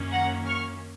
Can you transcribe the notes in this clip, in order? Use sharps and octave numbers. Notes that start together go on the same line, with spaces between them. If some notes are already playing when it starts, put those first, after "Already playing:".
Already playing: F#2 D#3 A#3 C#4
F#5 A#5
C#6 F6